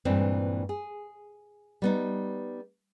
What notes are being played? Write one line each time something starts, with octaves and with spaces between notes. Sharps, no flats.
G2 A#2 E3 G#3 C4 D4
G#4
G3 B3 D#4